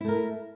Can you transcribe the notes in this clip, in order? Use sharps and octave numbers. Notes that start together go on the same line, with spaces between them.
A3 E4 A#4